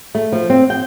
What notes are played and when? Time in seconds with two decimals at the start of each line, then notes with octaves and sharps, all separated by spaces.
0.15 A3
0.32 F3
0.50 C4
0.70 G5